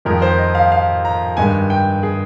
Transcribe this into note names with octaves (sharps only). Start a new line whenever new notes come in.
F2 D#3 G#3 A#4
C5
D#5
F5
F5
A#5
G2 D#3 G#3 G#5
G5
G#4